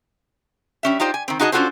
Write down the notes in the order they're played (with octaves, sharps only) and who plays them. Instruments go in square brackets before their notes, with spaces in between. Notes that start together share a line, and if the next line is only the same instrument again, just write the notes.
[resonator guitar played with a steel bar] G3 C#4 E5
D#4 F4 G4 C5 D5
G#5
D#3 C4
D#4 F#4 G#4 D#5 F5 A5
C#4 D4 F4 F#4 A4 C5